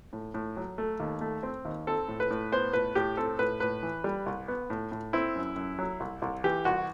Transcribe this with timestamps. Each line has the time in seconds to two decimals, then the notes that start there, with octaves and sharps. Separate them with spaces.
0.13 A2
0.34 A2
0.57 F#3
0.78 A3
1.00 D#2
1.21 A3
1.43 C4
1.65 D#2
1.87 C4 A4
2.08 A2
2.20 B4
2.31 A2
2.52 B3 C5
2.73 A2 B4
2.95 A2 G4
3.17 C4 A4
3.39 A2 B4
3.60 A2 B4
3.83 E3
4.04 G3
4.26 C2
4.48 B3
4.70 A2
4.92 A2
5.13 C4 E4
5.36 F#2
5.56 F#2
5.79 F#3
6.00 C2
6.22 C2
6.44 E3 G4
6.65 C2 F#4